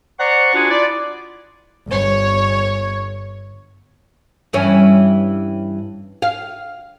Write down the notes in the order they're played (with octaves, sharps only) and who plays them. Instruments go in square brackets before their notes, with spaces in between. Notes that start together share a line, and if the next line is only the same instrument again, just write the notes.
[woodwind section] C5 D5 F#5 A#5 C#6
D4 F4 F#4 G#4 F#5
E4 F4 D5
[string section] G1 C#5
[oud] G2 E3 C#4
F5